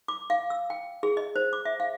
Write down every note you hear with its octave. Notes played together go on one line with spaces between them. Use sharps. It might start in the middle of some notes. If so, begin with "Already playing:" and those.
D6
F5
E6
G5
G#4
D#5
C5
D6
E5
F5